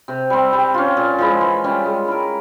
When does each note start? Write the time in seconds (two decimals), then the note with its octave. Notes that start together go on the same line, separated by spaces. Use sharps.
0.08 C3
0.30 G3 C4
0.53 G3
0.74 C#4 F4
0.97 A#2
1.18 F3 G#3 E4
1.41 E3
1.64 G3 C#4 F4
1.86 G#3
2.08 E4 A#4